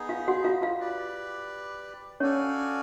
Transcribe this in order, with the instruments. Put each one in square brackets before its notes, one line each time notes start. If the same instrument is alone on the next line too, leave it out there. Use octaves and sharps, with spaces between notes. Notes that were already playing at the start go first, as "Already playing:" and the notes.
Already playing: [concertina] B3 D#4 G#4
[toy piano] F4 F5
F#4 F#5
F4 F5
F4 F5
[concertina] G4 B4 D5
[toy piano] C#4 C#5 [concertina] F#4 A4 D5 F5 G#5